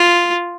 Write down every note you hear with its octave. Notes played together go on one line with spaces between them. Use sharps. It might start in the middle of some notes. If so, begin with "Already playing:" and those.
Already playing: F4